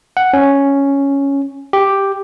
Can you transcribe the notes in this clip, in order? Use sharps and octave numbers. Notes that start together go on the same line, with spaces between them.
F#5
C#4
G4